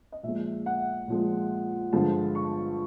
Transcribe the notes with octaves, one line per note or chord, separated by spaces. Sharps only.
D#5
A#2 F3 G#3 E5
F#5
A#2 F3 G#3
G2 D3 F3 G#3 A5
C#6